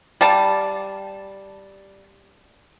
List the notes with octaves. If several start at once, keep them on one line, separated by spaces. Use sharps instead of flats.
G3 F5 A5